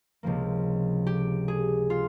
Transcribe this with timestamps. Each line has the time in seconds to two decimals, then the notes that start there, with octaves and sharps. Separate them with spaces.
0.23 C#2 C3 F3 A#3
1.07 G4
1.48 G#4
1.90 F4